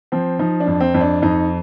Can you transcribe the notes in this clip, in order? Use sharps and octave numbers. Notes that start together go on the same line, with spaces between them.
F3 C4
F3 D#4
D4
F2
C4
F2
D4
F2 D#4